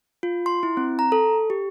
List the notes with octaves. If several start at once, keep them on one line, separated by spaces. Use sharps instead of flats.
F4
C6
E4
C4
A#5
A4
G4